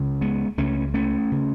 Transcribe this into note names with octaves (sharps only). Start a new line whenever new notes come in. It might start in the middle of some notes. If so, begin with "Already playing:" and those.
Already playing: C#2 C#3
G#3 B3
C#2 C#3 A3 C#4
A3 C#4
C#3